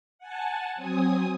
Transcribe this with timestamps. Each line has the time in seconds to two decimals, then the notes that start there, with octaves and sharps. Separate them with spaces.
0.19 F#5 G#5 A5
0.76 F#3 C4 G#5 D#6